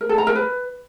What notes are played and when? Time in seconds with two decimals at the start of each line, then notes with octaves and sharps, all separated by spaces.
0.01 A#4
0.09 A4
0.18 A#5
0.27 A#4
0.36 B4